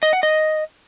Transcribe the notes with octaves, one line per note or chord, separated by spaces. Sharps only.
D#5
F#5
D#5